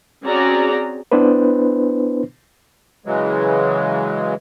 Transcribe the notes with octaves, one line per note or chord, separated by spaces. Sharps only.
C4 C#4 F#4 G#4 D5 A#5
B3 D4 E4 B4 C5
C#3 E3 F#3 G#3